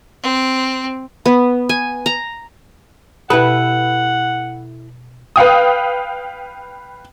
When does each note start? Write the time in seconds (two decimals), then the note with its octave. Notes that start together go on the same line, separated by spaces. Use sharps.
0.23 C4
1.26 B3
1.69 G#5
2.06 A#5
3.30 B2 E4 G4 A4 B4 F#5
5.36 B4 F5 G5 D#6